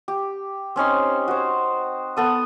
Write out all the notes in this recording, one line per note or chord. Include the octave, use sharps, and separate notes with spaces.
G4
C4 C#4 D#4 C6
F#4 C5
B3 A4 D#6